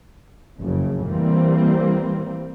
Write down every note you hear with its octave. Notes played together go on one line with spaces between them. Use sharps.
F#1 F2 C#3
E3 G3 A#3 C4